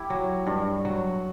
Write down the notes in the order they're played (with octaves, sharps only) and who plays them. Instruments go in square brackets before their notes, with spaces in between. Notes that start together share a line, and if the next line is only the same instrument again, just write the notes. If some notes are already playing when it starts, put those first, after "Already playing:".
Already playing: [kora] E4 G4
F#3
G2
F#3